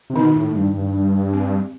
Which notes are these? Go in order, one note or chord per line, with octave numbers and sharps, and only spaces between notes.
C3
B2 D#3 D#4
A2
G2
G2
C4